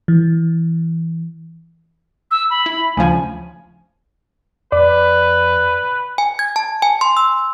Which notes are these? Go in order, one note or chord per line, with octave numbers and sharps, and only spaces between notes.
E3
E6
B5
E4
D2 C#3 F3 G#5
F2 B4 D5
G#5
G#6
A5
G#5
C6
E6